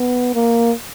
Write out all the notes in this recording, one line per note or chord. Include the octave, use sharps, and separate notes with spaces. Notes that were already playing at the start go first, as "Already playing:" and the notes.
Already playing: B3
A#3